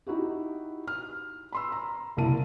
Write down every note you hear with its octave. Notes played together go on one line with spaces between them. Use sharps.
D#4 E4 F#4 G4
F6
B5 C6 E6
A#5
F#1 C2 A#3 E4 A5 D#7